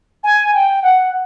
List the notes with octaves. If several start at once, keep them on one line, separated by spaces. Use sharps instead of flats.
G#5
G5
F#5